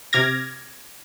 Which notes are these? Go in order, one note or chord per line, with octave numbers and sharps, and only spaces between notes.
C3 D6 F6 G#6 A#6